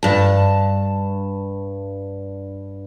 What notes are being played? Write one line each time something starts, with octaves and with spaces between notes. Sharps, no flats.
G2 A5